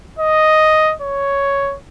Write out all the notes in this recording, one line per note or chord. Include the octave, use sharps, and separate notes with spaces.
D#5
C#5